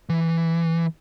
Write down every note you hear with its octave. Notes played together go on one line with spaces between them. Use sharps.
E3